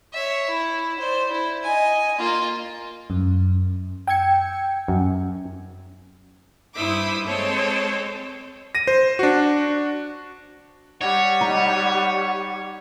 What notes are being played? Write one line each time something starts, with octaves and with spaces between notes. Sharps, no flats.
C#5 E5
E4
C5 D5
E4
D#5 G#5
A#3 F4
F#2
G5 E6 G#6 C#7
F#2
G2 E4 C5 E5 D6 D#6
G#3 C4 A4 C5 C#5
A#6 D#7
C5
D4 F#4
G3 C#5 F#5
D#4